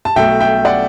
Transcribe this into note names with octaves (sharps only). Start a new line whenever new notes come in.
A5
B1 B2 A3 E5 G5
E5 G5
D5 F#5